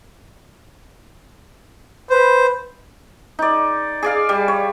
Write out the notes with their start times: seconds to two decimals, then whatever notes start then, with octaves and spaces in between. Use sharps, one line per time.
2.10 B4 C5
3.39 D#4 D5
4.02 G#4 D5 F5
4.29 G3
4.48 C#5